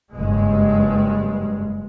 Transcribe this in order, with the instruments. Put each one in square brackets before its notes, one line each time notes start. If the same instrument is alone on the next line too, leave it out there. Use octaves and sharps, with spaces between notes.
[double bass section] F#1 G2 G#3